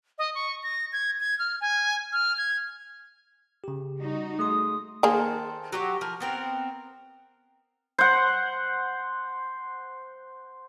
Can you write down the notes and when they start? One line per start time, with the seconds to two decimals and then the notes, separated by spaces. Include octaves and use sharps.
0.18 D#5
0.35 C#6
0.63 A#6
0.93 G#6
1.20 G#6
1.39 F6
1.61 G#5
2.13 F6
2.37 G#6
3.64 C#3 G4
3.98 G3 D#4 F#4
4.39 A3 G#4 C6 D#6
5.03 D#3 A#3 G#4 A4 C5
5.72 F#3 G4 C#5
6.01 F3 A#4
6.20 B3 C4 A#4
7.98 C5 F#5